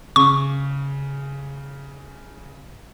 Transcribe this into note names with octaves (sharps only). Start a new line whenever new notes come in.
C#3 C#6